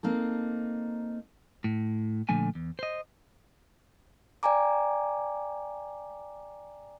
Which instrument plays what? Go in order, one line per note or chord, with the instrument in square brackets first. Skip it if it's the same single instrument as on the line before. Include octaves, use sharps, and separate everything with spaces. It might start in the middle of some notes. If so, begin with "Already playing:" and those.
[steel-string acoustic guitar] A#3 C4 D#4 A4
[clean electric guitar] A2
A#2 D3 F3 A3 G#5
E2
C5 D#5
[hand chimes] D5 G5 G#5 A#5 D6